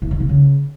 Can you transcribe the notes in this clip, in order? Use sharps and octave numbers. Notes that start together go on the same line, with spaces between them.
E3
D#3
C3
C#3